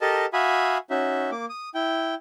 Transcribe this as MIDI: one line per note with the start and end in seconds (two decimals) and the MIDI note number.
0.01 0.26 67
0.01 0.26 69
0.01 0.26 70
0.01 0.26 75
0.01 0.26 81
0.33 0.78 66
0.33 0.78 76
0.33 0.78 77
0.33 0.78 80
0.33 0.78 83
0.33 0.78 87
0.90 1.30 61
0.90 1.30 63
0.90 1.30 66
0.90 1.30 76
1.31 1.45 58
1.31 1.45 86
1.49 1.69 87
1.75 2.15 64
1.75 2.15 79